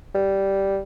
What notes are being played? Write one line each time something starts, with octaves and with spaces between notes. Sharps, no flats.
G3